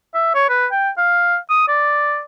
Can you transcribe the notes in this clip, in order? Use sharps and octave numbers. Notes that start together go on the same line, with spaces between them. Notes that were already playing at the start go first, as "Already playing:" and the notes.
E5
C#5
B4
G5
F5
D#6
D5